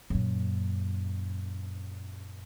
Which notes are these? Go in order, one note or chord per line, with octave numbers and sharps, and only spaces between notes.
F#2 A#2